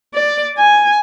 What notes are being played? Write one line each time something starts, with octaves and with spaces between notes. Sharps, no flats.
D5
G#5